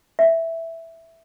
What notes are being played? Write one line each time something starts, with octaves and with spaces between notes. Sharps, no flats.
E5